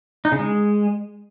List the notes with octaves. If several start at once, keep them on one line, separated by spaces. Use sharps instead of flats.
D#4
C#3
G#3